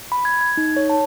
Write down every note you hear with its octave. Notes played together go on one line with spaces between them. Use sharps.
B5
G#6
G#6
D#4
C#5
A5